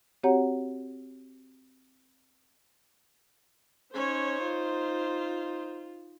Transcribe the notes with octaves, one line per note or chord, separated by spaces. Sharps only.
C4 F#4 G4 C#5 F#5 A#5
C#4 D#4 C5 C#5
F4